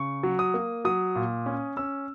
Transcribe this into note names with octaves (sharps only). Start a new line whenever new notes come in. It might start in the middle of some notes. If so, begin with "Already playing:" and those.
Already playing: C#3 C#6
F#3
D#6
A#3
F#3 D#6
A#2
C#4
C#4 E6